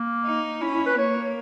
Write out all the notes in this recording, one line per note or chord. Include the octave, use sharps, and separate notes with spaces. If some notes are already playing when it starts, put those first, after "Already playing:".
Already playing: A#3
D#4
C#4 E4
E4
B4
A#3 C#5